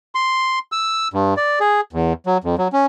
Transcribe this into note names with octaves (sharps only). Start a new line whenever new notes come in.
C6
E6
G2
D5
G#4
E2
F#3
F2
F#3
C#4